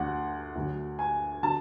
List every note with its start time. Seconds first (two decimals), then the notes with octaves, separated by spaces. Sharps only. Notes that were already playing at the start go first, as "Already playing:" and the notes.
Already playing: D2 D3 F#3 F#5
0.55 D2 D3 F#3
0.99 G#5
1.43 D3 F#3 A5